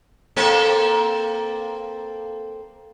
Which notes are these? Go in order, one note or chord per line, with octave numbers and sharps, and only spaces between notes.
A#3 C4 A4